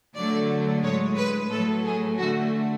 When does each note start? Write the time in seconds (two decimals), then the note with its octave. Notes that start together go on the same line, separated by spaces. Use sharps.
0.14 D3 F#3 A3 D5
0.82 A2 G#3 C#5
1.16 B4
1.50 A2 F#3 A3 A4
1.84 G#4
2.18 D3 A3 F#4